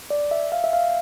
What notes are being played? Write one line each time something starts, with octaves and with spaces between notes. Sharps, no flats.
D5
E5
F5
E5
F5